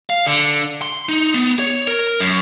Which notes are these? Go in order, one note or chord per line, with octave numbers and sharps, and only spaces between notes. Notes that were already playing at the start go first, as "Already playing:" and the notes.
F5
D3
C6
D#4
B3
C#5
A#4
F#2